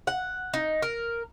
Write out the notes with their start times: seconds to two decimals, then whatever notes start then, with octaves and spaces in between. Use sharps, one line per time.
0.07 F#5
0.54 D#4
0.82 A#4